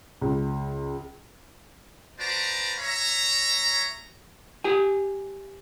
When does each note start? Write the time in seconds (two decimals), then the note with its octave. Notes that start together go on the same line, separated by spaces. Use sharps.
0.21 C#2
2.19 F#4 B4 C5 D5 A5 A#5
2.79 C#5 E5 A#5
4.64 G4 G#5